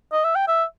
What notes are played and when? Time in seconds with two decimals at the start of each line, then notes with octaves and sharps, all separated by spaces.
0.12 D#5
0.24 E5
0.36 G5
0.48 E5